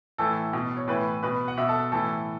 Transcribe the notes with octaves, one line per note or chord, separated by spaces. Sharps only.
A2 E3 A4
B2
C#5
A2 E3 B4
B2 B4
F#5
B2 E5
A4
A2 E3 A4